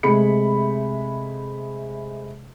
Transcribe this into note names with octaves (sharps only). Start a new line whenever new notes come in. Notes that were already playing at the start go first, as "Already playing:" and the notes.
C3 G#3 A3 G#4 B5 C#7